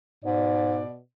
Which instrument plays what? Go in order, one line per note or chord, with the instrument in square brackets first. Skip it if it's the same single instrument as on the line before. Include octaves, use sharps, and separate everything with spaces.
[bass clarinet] G#2 [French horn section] B2 D5